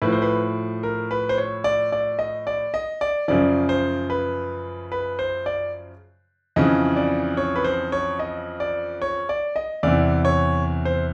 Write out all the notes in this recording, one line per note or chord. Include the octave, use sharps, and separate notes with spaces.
A2 F3 B4
C5
B4
A#4
B4
C5
C#5
D5
D5
D#5
D5
D#5
D5
F#2 C#3 F3 D5
C5
B4
B4
C5
D5
F2 C#3 E3 D#5
D5
C#5
B4
C5
C#5
D#5
D5
C#5
D5
D#5
E2 C3 E3 D5
C#5
C5